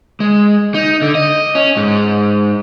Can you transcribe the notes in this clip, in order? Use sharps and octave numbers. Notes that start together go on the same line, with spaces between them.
G#3
D#4
D3
D#5
C#4
G#2